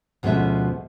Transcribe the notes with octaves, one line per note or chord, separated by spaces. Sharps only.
D2 B2 F3 G#3 C#4 E5